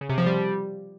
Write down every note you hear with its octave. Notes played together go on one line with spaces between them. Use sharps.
C#3
C3
F3
G3